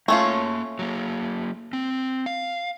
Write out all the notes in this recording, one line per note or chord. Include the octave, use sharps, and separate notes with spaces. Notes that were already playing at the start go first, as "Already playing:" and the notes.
A3 A#3 C#4 F4 C#5
F#3 A#3
C4
F5